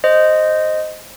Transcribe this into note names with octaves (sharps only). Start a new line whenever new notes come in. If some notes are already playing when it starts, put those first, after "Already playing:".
C5 D#5